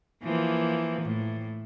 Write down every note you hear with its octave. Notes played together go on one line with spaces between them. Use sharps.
E3 F3 A#3
A2